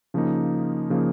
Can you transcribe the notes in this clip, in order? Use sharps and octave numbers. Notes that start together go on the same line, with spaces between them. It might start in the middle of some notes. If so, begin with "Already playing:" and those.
C#3 F3 A#3 D#4
C#3 F3 A#3 D#4